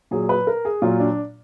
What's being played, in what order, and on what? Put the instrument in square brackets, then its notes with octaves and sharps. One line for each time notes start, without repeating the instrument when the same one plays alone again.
[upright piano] A#2 F#3 G#4
B4
A#4
G#4
A#2 F#3 F4
D4